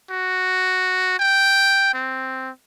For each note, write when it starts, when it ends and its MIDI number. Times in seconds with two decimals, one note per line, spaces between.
0.10 1.15 66
1.19 1.93 79
1.94 2.50 60